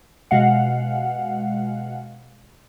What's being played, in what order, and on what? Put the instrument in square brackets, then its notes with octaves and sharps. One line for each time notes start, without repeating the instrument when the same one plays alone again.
[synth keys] B2 G#3 F5 F#5